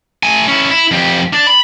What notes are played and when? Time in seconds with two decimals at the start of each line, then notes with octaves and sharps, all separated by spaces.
0.23 A3 G#5
0.48 C#4 E4
0.71 E4
0.91 F2 G4
1.33 D4 D5
1.47 B5